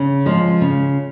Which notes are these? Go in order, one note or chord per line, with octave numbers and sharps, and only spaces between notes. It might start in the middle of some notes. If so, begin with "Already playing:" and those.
Already playing: C#3
F3 G#3
C#3